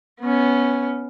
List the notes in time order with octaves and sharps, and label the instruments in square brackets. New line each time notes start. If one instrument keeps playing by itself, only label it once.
[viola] B3 C#4